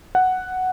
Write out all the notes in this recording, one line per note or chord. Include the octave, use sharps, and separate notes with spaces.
F#5